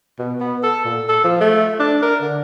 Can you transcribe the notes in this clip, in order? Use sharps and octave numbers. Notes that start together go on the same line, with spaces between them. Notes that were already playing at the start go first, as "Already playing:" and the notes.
B2
B3
A4
A#2
A4
F3
A3
D4
A#4
D3